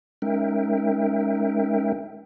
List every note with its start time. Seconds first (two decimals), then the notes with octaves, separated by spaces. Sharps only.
0.22 G#3 C#4 D#4 A#4 E5 G5